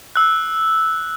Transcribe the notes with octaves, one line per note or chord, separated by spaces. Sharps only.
E6 F#6